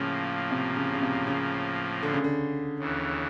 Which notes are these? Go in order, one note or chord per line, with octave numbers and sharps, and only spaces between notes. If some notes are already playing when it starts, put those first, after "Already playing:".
Already playing: A2 C#3 F3 A#3
C3
C#3
C#3
C3
C#3
D3
C#3
D3
D#2 C#3 E3